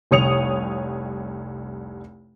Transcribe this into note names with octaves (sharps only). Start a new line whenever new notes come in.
F1 C2 C#5 D#6 C#7 F7